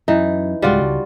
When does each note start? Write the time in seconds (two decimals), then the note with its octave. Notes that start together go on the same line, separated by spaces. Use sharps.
0.08 F#2 E3 D#4
0.62 D1 C#2 G3 G#3 F4 F#4
0.81 C#2